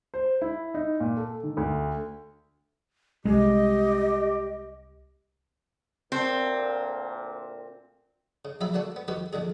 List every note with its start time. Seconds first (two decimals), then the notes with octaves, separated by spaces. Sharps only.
0.14 C5
0.42 E4
0.74 D#4
1.00 A#2
1.17 A4
1.43 D#3
1.57 D2
3.25 C2 G#3 G4 D#5
6.12 D2 A#2 C4
8.45 C#3
8.61 A#1 F#3 G#4 E5 A#5 B5
8.74 D3 A#3 D4 F#4
8.96 B3
9.08 F2 D#3 F#4 G4 B4
9.33 A#1 D#2 D3 G#4